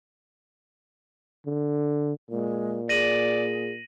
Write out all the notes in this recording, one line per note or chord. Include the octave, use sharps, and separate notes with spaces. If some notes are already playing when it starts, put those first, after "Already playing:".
D3
A#2 G#3
G#4 D5 A#6 D#7 F#7